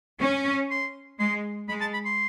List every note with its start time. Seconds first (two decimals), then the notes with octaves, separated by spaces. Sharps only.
0.21 C#4
0.70 C6
1.19 G#3 C6
1.68 G#3 B5
1.81 A5
1.93 B5
2.05 C6